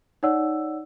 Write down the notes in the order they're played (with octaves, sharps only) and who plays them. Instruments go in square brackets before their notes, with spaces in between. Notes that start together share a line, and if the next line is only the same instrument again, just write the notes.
[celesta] D#4 C#5 D5 F#5 E6